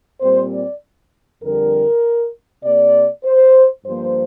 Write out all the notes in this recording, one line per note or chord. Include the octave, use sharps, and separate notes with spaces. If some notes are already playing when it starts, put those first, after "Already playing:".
A#2 G3 C4 C5
D5
F2 D3 G3 A#4
C3 A#3 D5
C5
G2 F3 A#3 C5